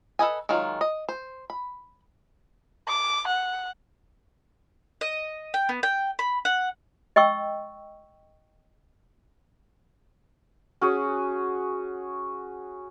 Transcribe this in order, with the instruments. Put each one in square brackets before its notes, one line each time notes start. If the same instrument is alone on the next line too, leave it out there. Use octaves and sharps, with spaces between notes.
[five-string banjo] A4 B4 D#5 G#5
D#3 F#3 G#3 F4
D#5
C5
B5
[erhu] D6
F#5
[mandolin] D#5
G5
B3
G5
B5
F#5
[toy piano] D#5 G5 C#6 E6
[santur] C#4 F#4 G#4